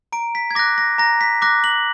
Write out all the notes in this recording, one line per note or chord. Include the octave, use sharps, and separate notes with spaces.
A#5 D7
B6
G#6
D6 F#6 A#6
A#6
A#5 A#6
B6
D6 F#6 A#6
F#7